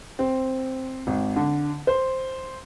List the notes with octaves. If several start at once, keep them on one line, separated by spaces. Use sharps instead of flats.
C4
G#1
D3
C5